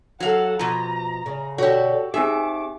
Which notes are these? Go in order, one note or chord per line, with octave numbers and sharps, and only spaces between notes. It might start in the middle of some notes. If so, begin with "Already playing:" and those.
F#3 A4 F5 F#5
B2 F3 A#5
C#3
B2 D3 F#4 G4 A4 C#5
C4 D#4 G4 G#4 E5 D6